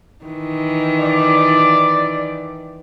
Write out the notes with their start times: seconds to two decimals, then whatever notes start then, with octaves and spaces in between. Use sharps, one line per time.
0.25 D#3 E3
0.99 D5